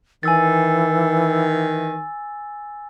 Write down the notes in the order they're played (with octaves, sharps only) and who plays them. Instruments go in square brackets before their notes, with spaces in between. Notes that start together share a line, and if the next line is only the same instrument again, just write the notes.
[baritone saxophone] D#3 [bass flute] E3 [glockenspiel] G#5 E6 A6